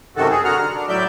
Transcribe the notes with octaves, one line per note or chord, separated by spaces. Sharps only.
F#2 C3 D#3 F#4 A4
G#4
D3 F#4 F#5 A#5 F6
F6
D4
A2 F#3 D5 E5 G6